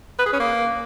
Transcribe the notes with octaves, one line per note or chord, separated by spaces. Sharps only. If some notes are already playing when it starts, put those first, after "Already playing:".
B4
G#4
C#4
A#3